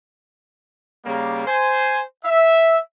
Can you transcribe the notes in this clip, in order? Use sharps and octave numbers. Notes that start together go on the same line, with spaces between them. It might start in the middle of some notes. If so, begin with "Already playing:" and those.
C#3 G3 A#3
C5 G#5
E5